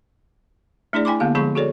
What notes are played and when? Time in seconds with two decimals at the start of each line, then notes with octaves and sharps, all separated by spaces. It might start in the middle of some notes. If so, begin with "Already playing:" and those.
0.93 A3 D4 E4 G#4 D5
1.05 E4 G5 G#5 B5 C6 D6
1.20 D3 A#3 B3 G4 F5
1.35 D3 F3 G#3 G#4 B5 C#6
1.55 F#4 G#4 A4 C#5 D5